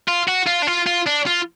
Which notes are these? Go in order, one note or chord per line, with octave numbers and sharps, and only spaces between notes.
F4
F#4
F4
D4
F4
F4
D4
F4